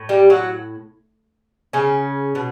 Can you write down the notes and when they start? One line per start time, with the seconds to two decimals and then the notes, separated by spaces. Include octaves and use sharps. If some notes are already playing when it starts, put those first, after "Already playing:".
Already playing: A2
0.09 G3 G4
0.30 F#3 F#4
1.73 C#3 C#4
2.35 B2